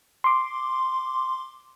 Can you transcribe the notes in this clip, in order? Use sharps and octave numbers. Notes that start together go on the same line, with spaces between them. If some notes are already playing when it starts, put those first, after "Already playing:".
C6 D6